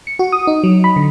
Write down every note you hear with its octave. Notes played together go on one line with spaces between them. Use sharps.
C#7
F#4
D#6
D#4
F#3
B5
D3